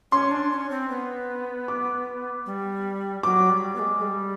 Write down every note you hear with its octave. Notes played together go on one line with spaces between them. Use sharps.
C#4 C6
D4
C#4
C4
B3
D6
G3
F#3 D6
G3
B3
G#3
G3